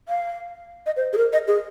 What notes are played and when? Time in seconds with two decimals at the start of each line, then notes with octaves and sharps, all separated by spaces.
0.09 F5
0.86 D#5
0.96 C5
1.13 G#4
1.17 A#4
1.33 D#5
1.48 G#4